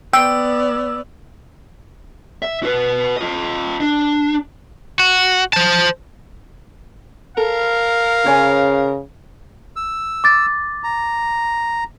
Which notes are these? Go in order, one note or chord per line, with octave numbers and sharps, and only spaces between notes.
B3 D5 G5 E6
E5
F#4 B4
F4 D#5
D4
F#4
C5 A5
A4 A#4 F5
C#3 C5 C#5 G#5
E6
D6 A6
A#5